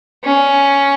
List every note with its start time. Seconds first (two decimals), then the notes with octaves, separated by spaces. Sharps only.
0.25 C#4